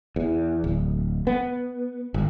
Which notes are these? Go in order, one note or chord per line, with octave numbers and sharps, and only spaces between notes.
E2
D1
B3
G1